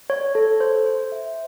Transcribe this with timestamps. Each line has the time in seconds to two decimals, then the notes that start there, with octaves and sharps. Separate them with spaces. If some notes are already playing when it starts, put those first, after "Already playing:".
0.10 C#5
0.35 A4
0.60 C5
0.86 C5
1.12 E5